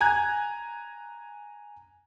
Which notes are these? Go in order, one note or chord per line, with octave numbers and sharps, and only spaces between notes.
G#5 A#5 F#6 G#6